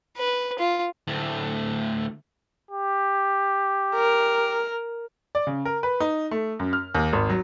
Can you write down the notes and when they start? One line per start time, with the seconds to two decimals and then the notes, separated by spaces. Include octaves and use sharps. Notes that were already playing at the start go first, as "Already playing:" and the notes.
0.17 B4
0.59 F4
1.07 D2 A2
2.71 G4
3.95 A#4
5.35 D5
5.47 C#3
5.65 A#4
5.83 B4
6.00 D#4
6.31 A3
6.59 F#2
6.73 F6
6.95 D#2
7.13 G#1
7.30 F#3